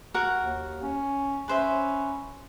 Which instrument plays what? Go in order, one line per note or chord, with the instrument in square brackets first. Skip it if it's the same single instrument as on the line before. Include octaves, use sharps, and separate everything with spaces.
[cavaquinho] F#4 A#4 F#5
[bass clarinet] D#2
C#4
[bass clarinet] C#4 [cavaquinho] B4 C5 E5